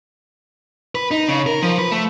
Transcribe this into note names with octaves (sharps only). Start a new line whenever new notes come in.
B4
D#4
C#3
A#4
F3
B4
A3